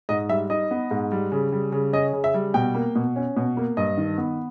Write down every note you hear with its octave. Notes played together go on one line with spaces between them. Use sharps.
G#2 D#5
G3 E5
D#4 D#5
B3
G#2
G3
C#3
G3
C#3
C#4 D#5
C#3
E5
G3
B2 G5
A#3
B2
C#4
B2
A#3
G2 D#5
D#3
B3